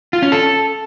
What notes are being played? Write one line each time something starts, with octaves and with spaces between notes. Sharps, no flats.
F4
C#4
A4